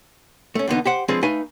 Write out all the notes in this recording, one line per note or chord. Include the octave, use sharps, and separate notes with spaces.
A3 C#4
E2 D3 B3 D#4
G4 C5 F#5
F3 G#3 C4 D4 G#4 B4
A3 D#4 B4 F5 G#5